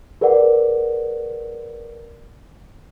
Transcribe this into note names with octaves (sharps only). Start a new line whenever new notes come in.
G#4 A#4 B4 D5 F#5